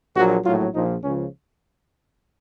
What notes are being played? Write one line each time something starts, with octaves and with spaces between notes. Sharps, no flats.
A#1 A#2 F#3 F#4
A#1 A2 F#3 F4
A#1 A#2 F3 D#4
C#2 C#3 F3 C#4